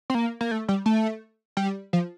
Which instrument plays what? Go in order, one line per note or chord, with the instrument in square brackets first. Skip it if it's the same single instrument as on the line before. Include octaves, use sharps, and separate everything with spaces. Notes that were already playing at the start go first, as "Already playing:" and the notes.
[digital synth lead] C4
A#3
A#3
A3
G3
A3
G3
F3